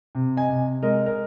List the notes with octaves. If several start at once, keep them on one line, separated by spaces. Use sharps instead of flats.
C3
D#5 G#5
C3
G#3 A#4 D#5
A#4 D#5